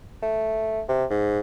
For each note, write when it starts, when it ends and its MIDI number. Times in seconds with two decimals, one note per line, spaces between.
0.23 0.82 57
0.89 1.05 48
1.10 1.40 44